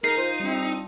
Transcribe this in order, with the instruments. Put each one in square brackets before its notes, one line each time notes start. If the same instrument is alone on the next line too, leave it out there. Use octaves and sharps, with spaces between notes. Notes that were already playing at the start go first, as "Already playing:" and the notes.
[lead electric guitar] D#4 [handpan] G#4 [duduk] A#4 [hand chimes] C7
[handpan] F4 [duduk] C5
[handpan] G3 D4 [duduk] C4